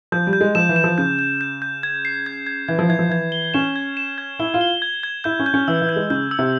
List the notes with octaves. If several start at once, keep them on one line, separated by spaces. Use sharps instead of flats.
F3 G6
G3
G6
G#3
F3 E7
E3
E7
F3
C#3 G6
G6
G6
G6
G#6
C7
G#6
G#6
E3 G#6
F3
E3 G#6
F3
E3 G#6
G7
C#4 E7
G#6
E7
G#6
E4 G7
F4
G7
G#6
G#6
E4 G6
C#4
G6
C#4
E3 E6
E3
G6
G#3
C#3 G6
E6
C3